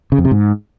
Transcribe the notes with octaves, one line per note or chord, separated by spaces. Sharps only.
C#3
F2
C3
G#2